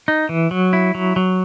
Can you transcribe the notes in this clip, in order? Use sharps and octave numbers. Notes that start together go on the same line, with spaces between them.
D#4
E3
F#3
E4
F#3
F#3